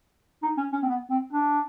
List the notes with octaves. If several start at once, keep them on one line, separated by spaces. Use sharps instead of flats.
D#4
C#4
C#4
C4
B3
C4
D4